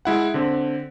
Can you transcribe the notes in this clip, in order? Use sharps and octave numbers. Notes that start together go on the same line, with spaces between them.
G#3 E4 F#5
D3 C4